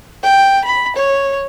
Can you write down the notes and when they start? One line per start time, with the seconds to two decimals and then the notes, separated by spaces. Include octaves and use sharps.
0.23 G5
0.64 B5
0.96 C#5